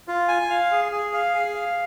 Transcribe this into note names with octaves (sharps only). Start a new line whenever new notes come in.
F4
G#5
F5
G#4
G#4
F5
G#4
F5